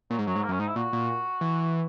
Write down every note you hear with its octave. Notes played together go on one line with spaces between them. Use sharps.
A#2 F#3
G#2
F#2 F#3
G#2
A#3
F#2 C#4
G#2 D#4
E4
A#2 F#4
A#2
E3